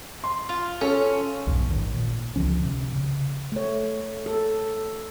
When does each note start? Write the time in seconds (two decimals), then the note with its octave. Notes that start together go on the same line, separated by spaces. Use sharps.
0.24 C6
0.49 F4
0.81 C#4 A4 C#5
1.47 B1 F2 G#2 B2
1.71 A1 G#2 D#3
1.94 A#2
2.36 C#2 D3 F3 C#4
2.65 C3
2.93 C#3
3.52 A3 C#5
4.26 A4